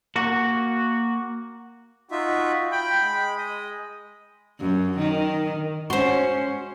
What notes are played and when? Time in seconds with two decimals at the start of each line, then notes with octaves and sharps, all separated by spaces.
0.16 A#3 F#4
2.11 D#4 F4 F#4 E5
2.72 G5 B5
3.01 G#3
3.38 D#5
4.60 F#2
4.98 D#3
5.90 G#3 C#4 F#4 C5 C6